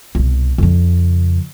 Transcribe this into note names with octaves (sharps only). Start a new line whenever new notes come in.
C2 B2
F2 C#3